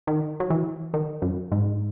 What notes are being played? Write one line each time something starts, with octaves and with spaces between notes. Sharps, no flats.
D#3
F#3
E3
D#3
F#2
G#2